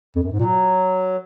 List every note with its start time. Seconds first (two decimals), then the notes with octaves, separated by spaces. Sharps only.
0.16 F2
0.23 F#2
0.31 G#2
0.39 A#2 F#3